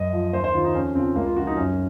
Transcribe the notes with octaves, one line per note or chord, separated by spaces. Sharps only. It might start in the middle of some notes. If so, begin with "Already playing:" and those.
Already playing: F#2 D#5
F3
D#2 C5
C5
D#3 F4
D#4
F2 C#4
C#3 F3 C4
C#2 A#3
F4
C#3 F3 F#4
D#4
F#2 C#4